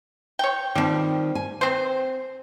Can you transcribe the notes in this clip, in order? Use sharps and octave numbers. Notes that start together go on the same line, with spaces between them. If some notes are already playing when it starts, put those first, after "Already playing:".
C#5 G5
D#3 F3 G3 C4
G#5
C4 C5